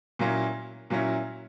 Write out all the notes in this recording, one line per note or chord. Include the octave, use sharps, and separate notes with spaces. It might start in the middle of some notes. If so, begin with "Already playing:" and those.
A#2 F#3 A#3 C#4 E4
A#2 F#3 A#3 C#4 E4